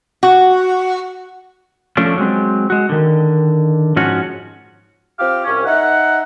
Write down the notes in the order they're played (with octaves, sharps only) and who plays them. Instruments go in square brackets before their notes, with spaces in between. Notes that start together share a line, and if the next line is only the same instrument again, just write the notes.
[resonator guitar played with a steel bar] F#4
[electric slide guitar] F3 A3 C#4 D4
F#3 G#3 C4
G#3 F#4
D3 D#3
G#2 F3 C#4 F#4
[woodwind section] C4 F4 G4 F5
C2 C#4
D#4 E5 F#5